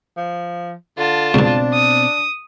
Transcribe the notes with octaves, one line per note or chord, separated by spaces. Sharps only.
F3
D3 F4 A5
C#2 G2 B2 C4 D4
D#6